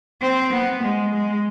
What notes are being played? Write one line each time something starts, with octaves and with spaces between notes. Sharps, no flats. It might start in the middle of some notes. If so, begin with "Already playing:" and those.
C4
B3
G#3
G#3